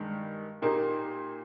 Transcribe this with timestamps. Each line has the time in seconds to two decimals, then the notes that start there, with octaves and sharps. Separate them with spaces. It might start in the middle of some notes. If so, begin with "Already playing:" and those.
Already playing: G2 D#3 G#3
0.62 A#2 A#3 D#4 G4